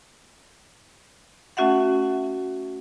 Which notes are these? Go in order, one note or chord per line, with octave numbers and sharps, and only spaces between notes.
A3 C#4 F#4 E5 F#5